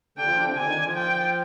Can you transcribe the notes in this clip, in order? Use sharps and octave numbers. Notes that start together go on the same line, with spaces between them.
D3 D4 G5
F3 F4
D3 D4
C3 C4
D3 D4 G#5
D#3 D#4
D3 D4
F3 F4
G5